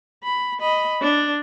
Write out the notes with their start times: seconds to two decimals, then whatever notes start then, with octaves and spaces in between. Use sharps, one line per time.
0.23 B5
0.61 D#5 B5
1.02 D4